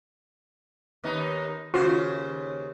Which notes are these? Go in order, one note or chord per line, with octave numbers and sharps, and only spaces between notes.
D#2 B3 D#4
D#2 C#3 F4 F#4 C5